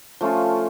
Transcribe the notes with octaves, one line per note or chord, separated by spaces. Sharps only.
F3 A3 C#4 F4